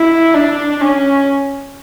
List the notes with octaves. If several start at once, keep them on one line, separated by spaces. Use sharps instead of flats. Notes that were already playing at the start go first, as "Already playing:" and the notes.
Already playing: E4
D4
C#4